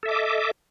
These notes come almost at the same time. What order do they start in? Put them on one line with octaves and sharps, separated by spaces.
A4 E5 D6 D#5